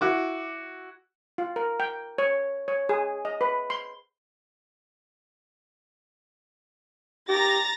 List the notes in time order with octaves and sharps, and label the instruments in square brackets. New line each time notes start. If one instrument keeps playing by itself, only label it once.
[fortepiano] E4 F#4 D6
[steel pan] F4
A#4
G5
C#5
C#5
G#4
D#5
B4
C6
[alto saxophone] G4 [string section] A#5 A6 A#6